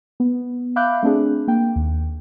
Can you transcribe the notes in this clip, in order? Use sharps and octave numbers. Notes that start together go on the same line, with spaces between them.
B3
E5 F5 B5 D6 F#6 G6
A3 C4 D4 G#4
A#3 G5
D#2